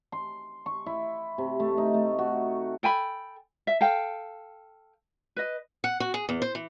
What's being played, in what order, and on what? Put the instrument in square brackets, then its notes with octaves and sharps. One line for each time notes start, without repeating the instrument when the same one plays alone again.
[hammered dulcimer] C6
C#6
E4
C3
A3
D#4
A3
F#4
[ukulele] A4 G5 G#5 B5
E5
A4 F5 G5
B4 D#5
[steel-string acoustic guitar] F#5
F#4
G#4
E2
C5
E3